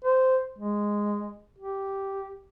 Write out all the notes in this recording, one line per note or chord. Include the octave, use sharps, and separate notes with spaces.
C5
G#3
G4